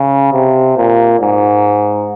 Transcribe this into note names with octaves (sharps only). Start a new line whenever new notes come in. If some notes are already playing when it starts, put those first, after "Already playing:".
Already playing: C#3
C3
A#2
G#2